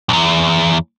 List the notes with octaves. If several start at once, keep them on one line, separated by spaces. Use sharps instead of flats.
B1 E2